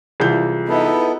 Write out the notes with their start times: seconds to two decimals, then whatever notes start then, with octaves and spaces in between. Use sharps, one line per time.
0.20 C2 E3 F4 G#4 G6
0.68 B3 D#4 E4 A4 B4